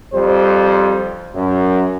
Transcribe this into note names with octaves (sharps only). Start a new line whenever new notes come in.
F2 G3 C5
F#2